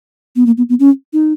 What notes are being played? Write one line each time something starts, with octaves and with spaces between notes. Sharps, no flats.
B3
A#3
B3
B3
C#4
D#4